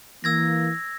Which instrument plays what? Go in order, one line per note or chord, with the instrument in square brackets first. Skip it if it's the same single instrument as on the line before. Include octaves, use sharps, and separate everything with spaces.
[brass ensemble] E3 A#3 [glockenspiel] E6 G#6 A#6